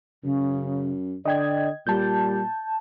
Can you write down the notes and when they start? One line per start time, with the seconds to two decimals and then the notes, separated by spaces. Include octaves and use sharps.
0.24 F#2 C#3
1.25 D3 D5 D#5 G5 G#6
1.87 A#2 G3 A5 G6